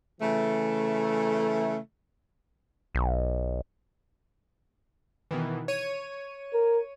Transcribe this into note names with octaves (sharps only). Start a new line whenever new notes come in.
C#3 E3 A3
B1
B2 D#3 E3
C#5 D#7
A#4